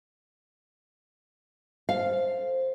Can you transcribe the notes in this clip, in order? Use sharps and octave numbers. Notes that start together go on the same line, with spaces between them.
A4 C5 F5